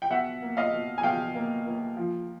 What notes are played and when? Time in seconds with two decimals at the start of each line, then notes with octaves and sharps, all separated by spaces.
0.02 G5
0.10 B2 E5 F#5
0.42 A#3
0.57 D#5 F5
0.73 B2
0.98 G#5
1.03 B2 F5 G5
1.35 A#3
1.66 A#3
1.97 F3